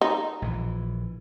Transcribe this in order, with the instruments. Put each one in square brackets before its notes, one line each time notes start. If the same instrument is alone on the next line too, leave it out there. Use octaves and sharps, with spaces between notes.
[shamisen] D#4
[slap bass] A#1 E3